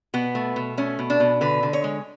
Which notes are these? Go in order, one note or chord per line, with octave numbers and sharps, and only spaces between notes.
B2 B3
A3
B2
A3 C#4
B2
D4
B2
D3 B4
D3
C#5
G#3